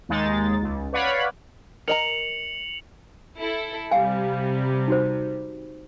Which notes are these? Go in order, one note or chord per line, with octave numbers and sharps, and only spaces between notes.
D#2 G#3 D#4 A6
C#2
B4 C#5 D5 F5 F#5 B5
A#4 D#5 A#5 C#7 F7 F#7
E4 A4
C3 G3 F5 G#5
D#4 F#4 C5